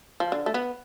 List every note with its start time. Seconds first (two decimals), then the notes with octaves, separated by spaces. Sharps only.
0.20 F3
0.32 D3
0.46 A3
0.54 B3